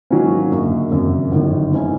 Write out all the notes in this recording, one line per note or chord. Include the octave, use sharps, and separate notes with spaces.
G#2 D#3 F#3 A#3 C#4
F#1 F#2 D3
G#1 F#2 C#3
G1 F#2 D#3
G#2 E3 A3 C#4 E4